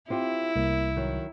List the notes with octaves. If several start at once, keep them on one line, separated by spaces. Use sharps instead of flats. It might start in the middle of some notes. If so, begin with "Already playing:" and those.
C4 E4 F4 G4
C2 A#3
D#3 F#3